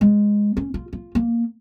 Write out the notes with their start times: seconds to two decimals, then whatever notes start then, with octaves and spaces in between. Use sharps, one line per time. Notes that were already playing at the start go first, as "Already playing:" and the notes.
0.01 G#3
0.57 C#4
0.74 F4
0.93 F4
1.15 A#3